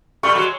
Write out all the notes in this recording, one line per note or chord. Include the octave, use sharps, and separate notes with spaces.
G3 A3 C#6
F#3 G#3